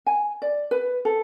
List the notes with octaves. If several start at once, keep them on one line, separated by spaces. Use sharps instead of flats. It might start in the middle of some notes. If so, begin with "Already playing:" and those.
G#5
D5
B4
A4